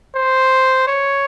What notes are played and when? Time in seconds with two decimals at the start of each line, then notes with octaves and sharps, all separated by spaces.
0.15 C5
0.87 C#5